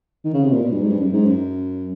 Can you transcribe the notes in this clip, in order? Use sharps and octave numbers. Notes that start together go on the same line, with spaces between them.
D#3
C#3
C3
A#2
B2
G2
G#2
G2
F#2
G#2
F#2